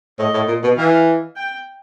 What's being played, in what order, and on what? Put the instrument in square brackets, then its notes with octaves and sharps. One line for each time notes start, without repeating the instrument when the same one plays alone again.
[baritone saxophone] A2 [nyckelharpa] D#5
[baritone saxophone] A2
A#2
B2
[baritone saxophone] E3 [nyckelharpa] F5
[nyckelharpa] G5